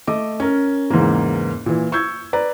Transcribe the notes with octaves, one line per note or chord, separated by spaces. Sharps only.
A3 D#5 D6
C#4 A#4
E2 G#2 C#3 E3 A#3
A#2 E3
C#6 E6 G6 G#6
B4 D5 A#5